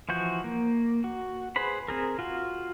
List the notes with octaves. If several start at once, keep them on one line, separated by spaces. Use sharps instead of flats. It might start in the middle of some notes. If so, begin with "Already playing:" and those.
E3 F3 F#4 G6
A#3
F#4
G#4 B4 C5 B5
C4 G#4 A#4
F4 F#4